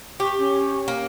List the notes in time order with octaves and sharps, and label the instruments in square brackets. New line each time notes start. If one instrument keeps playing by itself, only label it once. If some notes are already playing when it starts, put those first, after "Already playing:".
[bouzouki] G4 [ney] C#6
[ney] C#4
[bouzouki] A#3